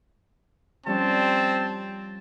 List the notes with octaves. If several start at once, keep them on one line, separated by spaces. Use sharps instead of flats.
F3 G3 C4 C#4 A5